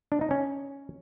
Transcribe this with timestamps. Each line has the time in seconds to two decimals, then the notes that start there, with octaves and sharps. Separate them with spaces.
0.12 D4
0.21 D#4
0.31 C#4